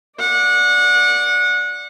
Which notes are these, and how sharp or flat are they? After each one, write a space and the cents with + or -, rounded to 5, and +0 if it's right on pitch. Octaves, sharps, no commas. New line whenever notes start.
D5 +0 F#5 -25